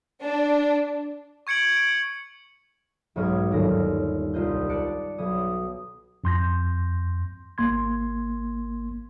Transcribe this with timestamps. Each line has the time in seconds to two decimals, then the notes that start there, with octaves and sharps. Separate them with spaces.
0.22 D4
1.47 C#6 G#6 C#7 D7 F#7
1.76 D7 F#7
3.16 B1 G#2 C#5 D#5 C#6 F6
3.51 G1 D#2 F#3 A#6
3.69 F6
4.34 C2 F4 D#5 G6
4.69 D5 A5 F#6 A6 C#7 D7
5.18 B1 D#6 G#6
6.24 F2 C6 G6 A#6
7.58 G#1 A#3 C6 G#6